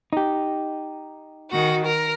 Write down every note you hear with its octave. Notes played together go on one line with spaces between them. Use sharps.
D#4 G4
D#3 F#4
A#4